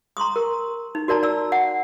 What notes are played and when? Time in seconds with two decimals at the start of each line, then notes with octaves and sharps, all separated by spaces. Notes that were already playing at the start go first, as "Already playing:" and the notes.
0.17 A#5 C6 C#6 D#6
0.36 A#4
0.95 D#4
1.08 F#4 A#4 D5 A5 A#5
1.23 D5 E6
1.52 F#5